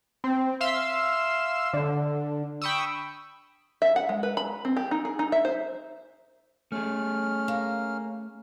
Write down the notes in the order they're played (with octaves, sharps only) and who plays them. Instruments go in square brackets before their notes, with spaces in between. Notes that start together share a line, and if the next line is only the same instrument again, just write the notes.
[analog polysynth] C4
E5 F5 C6 E6
D3
G5 B5 C#6 D#6 E6
[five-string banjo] E5
F#5
G#3
B4
B5
C4
G4
D#4
G#4
D#4
E5
C5
[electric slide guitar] A3 G#4 [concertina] C#4 F6
[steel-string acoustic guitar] A#3